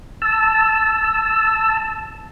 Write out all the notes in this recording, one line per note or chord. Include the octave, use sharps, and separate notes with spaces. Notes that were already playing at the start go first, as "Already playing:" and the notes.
A5 E6